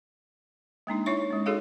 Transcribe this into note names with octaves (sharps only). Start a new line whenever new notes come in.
G#3 A#3 D4 D#4
D#4 E4 C#5 E5 C#6
G#3 C#4
D#4 F#4 G#4 A4 C#5 F5